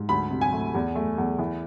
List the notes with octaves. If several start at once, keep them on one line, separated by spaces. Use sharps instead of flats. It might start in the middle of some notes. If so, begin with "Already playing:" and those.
Already playing: G#2
D2 B5
C3
G#5
A3
E2
A3
E2
E3